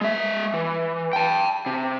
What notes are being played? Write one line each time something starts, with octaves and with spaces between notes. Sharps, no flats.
G#3 E5
E3
G5 A5
C3